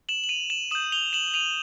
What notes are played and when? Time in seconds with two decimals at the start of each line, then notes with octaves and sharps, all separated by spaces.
0.09 E7 F#7
0.24 F#7
0.29 D#7 F7
0.50 E7 F#7
0.71 D#6 G6 E7 F#7
0.92 F7 G7
1.13 E7 F#7
1.34 D#7 F7